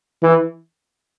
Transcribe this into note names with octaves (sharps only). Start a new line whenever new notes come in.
E3